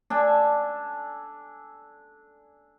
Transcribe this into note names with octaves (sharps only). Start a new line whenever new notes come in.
D4 A4 G#5